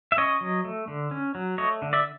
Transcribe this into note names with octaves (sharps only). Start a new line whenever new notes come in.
E5
C#4 C#5 D#5
F#3
A3
D3
C#4
F#3
A3 C#5 D#5
D3
D5 E5